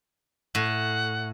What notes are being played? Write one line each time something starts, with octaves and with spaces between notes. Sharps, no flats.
A2 F#5